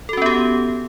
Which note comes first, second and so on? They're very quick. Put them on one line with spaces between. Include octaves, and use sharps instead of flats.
A4 F#4 C#4 B3 G4